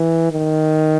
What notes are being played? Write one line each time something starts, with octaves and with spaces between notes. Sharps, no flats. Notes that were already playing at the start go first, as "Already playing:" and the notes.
Already playing: E3
D#3